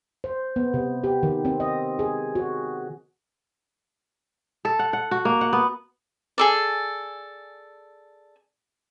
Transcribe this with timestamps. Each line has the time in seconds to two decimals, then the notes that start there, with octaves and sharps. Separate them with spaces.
0.24 C5
0.56 B3
0.74 C3
1.04 G4
1.23 D#3
1.45 C4
1.60 D#5
1.99 G#4
2.35 F#4
4.65 A4
4.79 F#5
4.93 F#5
5.11 F#4
5.25 A#3
5.41 F#5
5.53 B3
6.38 G#4 A4 D5